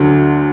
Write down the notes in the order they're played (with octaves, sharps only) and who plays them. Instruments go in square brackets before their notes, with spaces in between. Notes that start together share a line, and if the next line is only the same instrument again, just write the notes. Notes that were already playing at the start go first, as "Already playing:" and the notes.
Already playing: [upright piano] D2 D3 F#3